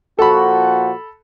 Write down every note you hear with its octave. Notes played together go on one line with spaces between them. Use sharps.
A#2 F3 F#4 A4 B5